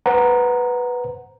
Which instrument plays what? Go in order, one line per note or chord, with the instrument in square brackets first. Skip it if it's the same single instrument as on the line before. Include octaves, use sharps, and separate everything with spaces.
[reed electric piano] B4 C5 F#5 A#5